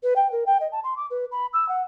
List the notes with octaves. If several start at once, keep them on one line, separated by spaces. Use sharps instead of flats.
B4
G5
A#4
G5
D#5
A5
C6
D6
B4
B5
E6
F#5